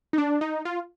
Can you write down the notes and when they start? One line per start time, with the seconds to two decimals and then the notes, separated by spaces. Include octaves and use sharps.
0.13 D#4
0.18 D4
0.41 D#4
0.65 F4